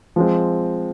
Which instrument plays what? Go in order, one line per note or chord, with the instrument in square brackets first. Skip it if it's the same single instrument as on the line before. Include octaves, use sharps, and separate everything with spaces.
[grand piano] F3 G#3 C4